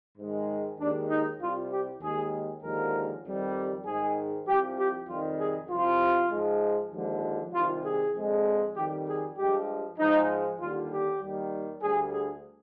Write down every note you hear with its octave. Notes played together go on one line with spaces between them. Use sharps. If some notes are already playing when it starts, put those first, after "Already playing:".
G#2 D#3 G#3
D#2 D#3 G#3 D4
D#4
C2 C3 G3 F4
G4
D#2 D#3 G#3 G#4
D#2 D3 F3 G#3 A#4
F2 D#3 G3
G#2 D#3 G#3 G#4
C2 C3 F3 G4
G4
F2 C3 D#3 G3 F4
G#4
C2 C3 F3 F4
G#2 F3 G#3
D#2 D3 F3 G#3
C2 C3 D#3 F4
G#4
F2 D3 G#3
F2 D#3 G3 G4
G#4
G2 F3 G#3 G4
G#2 F3 G#3 D#4
D#2 D3 G3 F4
G4
D#2 D#3 G3
D2 D3 G3 G#4
G#4